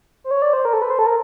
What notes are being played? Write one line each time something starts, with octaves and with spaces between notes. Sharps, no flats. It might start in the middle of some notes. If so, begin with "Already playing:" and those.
C5
C#5
D5
C5
A#4
A4
B4
C5
A4
A#4